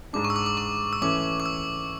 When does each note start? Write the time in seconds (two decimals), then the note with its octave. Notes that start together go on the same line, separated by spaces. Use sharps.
0.13 G#2 G#3 D4 D6
0.25 C#6
0.30 E6
0.36 D6
0.46 D6
0.57 C#6
0.93 E6
1.02 E3 A3 C#4 D6
1.40 D6
1.46 E6